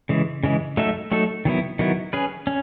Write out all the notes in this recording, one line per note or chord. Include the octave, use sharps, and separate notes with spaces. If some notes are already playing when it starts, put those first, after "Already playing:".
C#3 E3 G#3
C#3 E3 G#3
F#3 A3 D#4 A4 E5
F#3 A3 D#4 A4 E5
D#3 F#3 B3 E4
D#3 F#3 B3 E4
C#4 G#4 B4
C#4